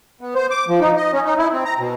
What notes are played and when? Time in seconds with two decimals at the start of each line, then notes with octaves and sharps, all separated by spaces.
0.21 B3
0.35 C5
0.51 D6
0.68 F3
0.81 D#4
0.97 D#5
1.13 C#4
1.25 D#4
1.38 E4
1.52 C4
1.65 A#5
1.79 B2